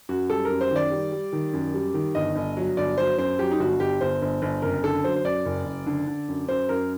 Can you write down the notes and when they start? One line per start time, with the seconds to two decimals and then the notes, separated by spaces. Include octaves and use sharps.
0.09 F#2 F#4
0.29 G3 A4
0.45 F#2 A#4
0.61 C5
0.71 D#3 D5
0.91 G3
1.12 G3
1.33 D#3
1.53 F#2
1.74 G3
1.94 D#3
2.15 G1 D#5
2.36 G1
2.57 F#3
2.77 G1 D5
2.98 F#3 C5
3.18 F#2 C5
3.39 F#3 G4
3.51 D#4
3.60 G1 F#4
3.80 G1 G4
4.01 G1 C5
4.22 G1
4.42 G1
4.62 F#1 A#4
4.84 D3 A4
5.04 F#3 C5
5.16 C5
5.24 F#2 D5
5.46 F#1
5.66 F#1
5.86 D3
6.07 D3
6.28 F#2
6.48 F#2 C5
6.69 F#2 A#4